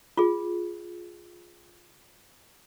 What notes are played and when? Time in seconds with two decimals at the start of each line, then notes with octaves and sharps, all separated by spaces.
0.17 F4 G#4